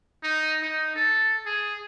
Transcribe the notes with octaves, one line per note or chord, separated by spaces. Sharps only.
D#4
D#4
A4
G#4